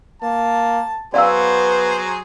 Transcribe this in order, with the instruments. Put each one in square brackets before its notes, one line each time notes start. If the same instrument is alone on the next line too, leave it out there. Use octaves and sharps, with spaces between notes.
[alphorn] A#3 [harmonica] A5
[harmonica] F#3 G#4 C5 [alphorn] B3 [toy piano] D5 F5 E6